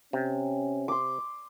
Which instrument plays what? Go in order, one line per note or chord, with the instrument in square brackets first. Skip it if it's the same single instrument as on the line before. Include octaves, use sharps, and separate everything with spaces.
[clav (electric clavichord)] C3 [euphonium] C#4
[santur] C6 D6